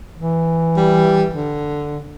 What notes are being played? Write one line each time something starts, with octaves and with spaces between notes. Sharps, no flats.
E3
G3
D3